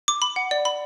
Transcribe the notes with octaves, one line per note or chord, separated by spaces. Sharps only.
D6
B5
F#5
D5
B5